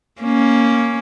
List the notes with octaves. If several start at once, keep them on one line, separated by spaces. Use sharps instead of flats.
A#3 C#4